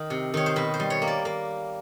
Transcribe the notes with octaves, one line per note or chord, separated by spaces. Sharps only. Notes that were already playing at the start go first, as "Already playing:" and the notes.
Already playing: D#3
C3
D#3 C#5
C5
B2 B4
C5
G3
C#5
A#3
D5
A#3